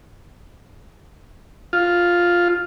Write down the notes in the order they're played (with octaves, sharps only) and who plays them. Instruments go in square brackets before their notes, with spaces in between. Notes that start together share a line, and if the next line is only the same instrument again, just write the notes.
[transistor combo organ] F4